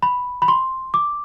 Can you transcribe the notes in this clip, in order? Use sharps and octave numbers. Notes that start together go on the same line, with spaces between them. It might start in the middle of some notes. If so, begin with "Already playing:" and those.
B5
B5
C6
D6